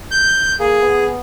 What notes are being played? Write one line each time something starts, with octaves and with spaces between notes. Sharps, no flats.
G6
A#3 G#4
B3